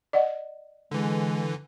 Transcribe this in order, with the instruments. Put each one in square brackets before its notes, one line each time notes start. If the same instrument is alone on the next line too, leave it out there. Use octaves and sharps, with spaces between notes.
[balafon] D5 D#5 F#5
[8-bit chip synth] D3 E3 [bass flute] G#3